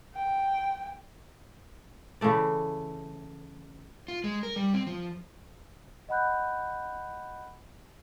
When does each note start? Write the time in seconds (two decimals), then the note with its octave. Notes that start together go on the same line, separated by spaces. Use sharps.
0.15 G5
2.21 C#3 E3 A3 D5
4.08 F4
4.24 G#3
4.43 A#4
4.56 G3
4.74 C4
4.87 F3
6.09 D#5 F#5 B5 F#6 G6